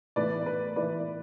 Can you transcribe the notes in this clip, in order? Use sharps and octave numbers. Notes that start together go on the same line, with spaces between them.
A2 E3 B3 E4 B4 D5
B4
A2 E3 B3 E4 B4 D5